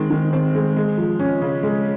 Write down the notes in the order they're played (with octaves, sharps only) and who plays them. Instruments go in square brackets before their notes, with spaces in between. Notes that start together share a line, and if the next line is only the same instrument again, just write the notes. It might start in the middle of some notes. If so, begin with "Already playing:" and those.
Already playing: [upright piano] D#3 G#3 C4
D#3
C4
G#3
G#3
F3
C#4
C#3
G#3